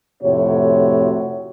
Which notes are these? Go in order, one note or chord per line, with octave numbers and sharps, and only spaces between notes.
F2 A2 C3 F#4 C#5